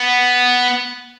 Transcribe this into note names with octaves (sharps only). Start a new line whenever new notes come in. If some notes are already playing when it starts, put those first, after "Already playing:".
Already playing: B3